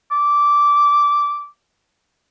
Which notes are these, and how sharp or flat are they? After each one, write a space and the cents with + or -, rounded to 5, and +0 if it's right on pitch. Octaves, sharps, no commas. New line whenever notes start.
D6 -10